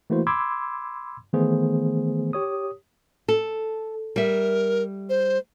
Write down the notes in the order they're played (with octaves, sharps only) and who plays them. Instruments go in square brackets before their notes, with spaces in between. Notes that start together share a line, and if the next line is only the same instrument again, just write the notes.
[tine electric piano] E3 A3 A#3 E4 F#4 C5
B5 C6 D6 E6 G#6
D#3 E3 A3 B3 G#4 C5
G4 C#5 D#6
[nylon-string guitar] A4
[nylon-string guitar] G3 E5 [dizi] A#4
[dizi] C5